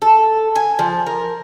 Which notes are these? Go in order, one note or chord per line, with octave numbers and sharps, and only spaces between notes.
A4
G#5
F3
A#4